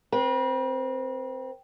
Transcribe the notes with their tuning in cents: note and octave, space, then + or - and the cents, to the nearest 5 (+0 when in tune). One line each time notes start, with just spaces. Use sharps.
C4 +0 B4 -40